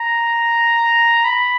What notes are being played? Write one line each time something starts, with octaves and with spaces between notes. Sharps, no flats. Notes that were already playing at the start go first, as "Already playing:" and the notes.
Already playing: A#5
B5